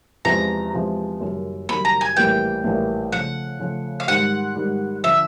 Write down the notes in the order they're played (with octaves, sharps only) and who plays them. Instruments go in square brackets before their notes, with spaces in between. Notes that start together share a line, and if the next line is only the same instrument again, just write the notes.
[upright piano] E2 C3 F3 G#3 [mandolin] A#5
[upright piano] E2 C3 F3 G#3
F#1 F#2 D#3 G3
[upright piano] F#1 F#2 D#3 G3 [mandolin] B5
[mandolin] A#5
G#5
[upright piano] A#1 A2 E3 G3 A#3 [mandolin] G5
[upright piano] A#1 A2 E3 G3 A#3
[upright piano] C#3 F3 A3 [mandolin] F#5
[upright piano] C#3 F3 A3
[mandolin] F5
[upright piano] G#2 D#3 G3 [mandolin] F#5
[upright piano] G#2 D#3 G3
[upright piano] D3 F3 [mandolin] E5